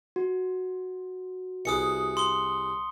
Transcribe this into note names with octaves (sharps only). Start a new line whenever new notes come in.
F#4
C2 G#4 B4 D#6 C#7
C6 D#6 G7